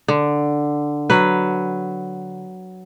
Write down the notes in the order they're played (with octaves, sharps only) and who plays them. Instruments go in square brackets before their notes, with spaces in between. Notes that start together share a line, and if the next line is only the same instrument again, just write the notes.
[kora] D3
F#3 B4